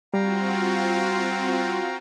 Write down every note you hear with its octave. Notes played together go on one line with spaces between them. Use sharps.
G3 C4 F4 F#4 F5 G5 A#5